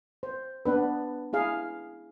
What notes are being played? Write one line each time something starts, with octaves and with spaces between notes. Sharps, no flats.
C5
B3 D4 B4
E4 G#4 F5